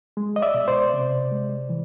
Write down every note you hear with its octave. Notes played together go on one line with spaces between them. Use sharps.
G#3
D#5
D5 E5
B2
C5 D5
C3
G#3
E3